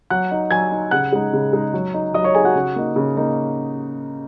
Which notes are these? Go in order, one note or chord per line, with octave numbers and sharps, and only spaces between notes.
F#3 F#5 F#6
D#4
F#3 G#5 G#6
D#4
C#3 F#5 F#6
G#3 D#4
C#3
G#3 D#4
F#3
D#4
F#3 D#5 D#6
C#5 C#6
D#4 G#4 G#5
F#4 F#5
C#3
A#3 D#4
C#3
A#3 D#4